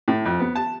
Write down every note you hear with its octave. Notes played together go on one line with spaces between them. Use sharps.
A2
F2
B3
A5